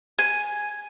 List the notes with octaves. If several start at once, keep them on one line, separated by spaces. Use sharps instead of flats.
G#5